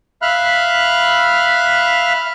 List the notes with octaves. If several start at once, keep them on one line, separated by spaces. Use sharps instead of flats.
E5 F5 B5 F6 F#6